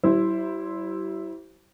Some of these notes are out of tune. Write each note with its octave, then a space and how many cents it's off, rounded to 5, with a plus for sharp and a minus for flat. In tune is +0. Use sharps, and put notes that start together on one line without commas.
G3 -45 E4 +0 C5 +0